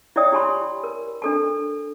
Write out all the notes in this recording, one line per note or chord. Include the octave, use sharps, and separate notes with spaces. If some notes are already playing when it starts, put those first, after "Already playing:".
E4 C#5 D5 E5 G5 D#6
E4 G4 G#5 A5 B5 C6
A#4
D4 A4 A5